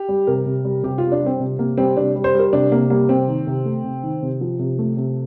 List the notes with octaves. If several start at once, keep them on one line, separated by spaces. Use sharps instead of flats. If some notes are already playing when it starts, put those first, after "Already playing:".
Already playing: G4
G3
C3 A#4
C3
G3
C3 G4
G3 F4
D4
G3 C4
C3
C3 A#3
G3 C4
C3 D4
G3
C5
G3 A#4
C3 D4
C3 A#3
G3 A#3
C3 C4
D#3
C3
A3
C3
D#3
C3
F3
C3
A3
C3